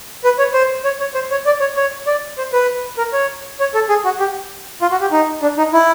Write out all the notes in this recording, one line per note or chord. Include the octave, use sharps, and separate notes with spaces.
B4
C#5
C5
C#5
C#5
C5
C#5
D5
C#5
C#5
D5
C5
B4
A#4
C#5
C#5
A4
G#4
F#4
G4
F4
F#4
G4
D#4
D4
D#4
E4